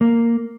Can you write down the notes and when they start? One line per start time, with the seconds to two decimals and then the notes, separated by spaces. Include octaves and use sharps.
0.01 A#3